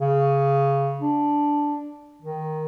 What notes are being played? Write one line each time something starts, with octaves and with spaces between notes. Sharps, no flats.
C#3
D4
D#3